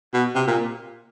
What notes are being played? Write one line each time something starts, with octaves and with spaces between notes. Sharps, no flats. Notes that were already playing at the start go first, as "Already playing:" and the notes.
B2
C3
A#2